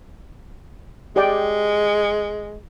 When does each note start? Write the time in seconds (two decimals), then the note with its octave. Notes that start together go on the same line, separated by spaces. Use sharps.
1.16 G#3 G4 D5 G5